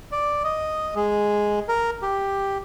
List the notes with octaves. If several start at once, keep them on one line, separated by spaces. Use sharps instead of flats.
D5
D#5
G#3
A#4
G4